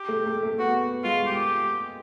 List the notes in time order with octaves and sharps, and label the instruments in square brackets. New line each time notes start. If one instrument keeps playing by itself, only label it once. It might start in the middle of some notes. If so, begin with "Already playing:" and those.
Already playing: [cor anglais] G4
[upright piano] A3
A3
A3
[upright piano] B3 [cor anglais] F#4
[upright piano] G#3 [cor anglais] F4
[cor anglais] G4